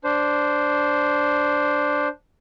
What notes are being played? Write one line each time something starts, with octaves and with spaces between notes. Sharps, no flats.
D4 C5